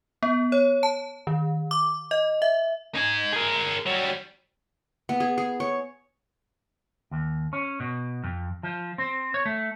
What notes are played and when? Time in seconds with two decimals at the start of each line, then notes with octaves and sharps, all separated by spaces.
0.23 B3
0.52 C#5
0.83 A5
1.27 D#3
1.71 D6
2.11 D#5
2.42 E5
2.96 D#4 G#5
3.33 G#4 A#4
3.86 F#3 G3
5.09 B3
5.20 G#4
5.38 G#4
5.60 C#5
7.11 D#2
7.53 C#4
7.80 B2
8.24 F2
8.63 F3
8.98 C4
9.34 C#5
9.45 A3